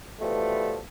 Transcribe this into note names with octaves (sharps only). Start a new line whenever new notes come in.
B2 E3 F3 G3 A3